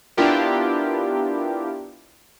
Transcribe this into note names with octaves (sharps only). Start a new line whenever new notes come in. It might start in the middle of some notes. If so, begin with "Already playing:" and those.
B3 D4 E4 F4 G4 A#4